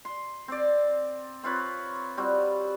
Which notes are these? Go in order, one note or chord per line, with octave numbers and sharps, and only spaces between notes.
C6
C4 D5
C4 F4 B4 C#5
G3 C4 F4 F#4